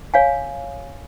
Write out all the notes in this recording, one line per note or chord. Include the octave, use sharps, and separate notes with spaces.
C#5 F5 G#5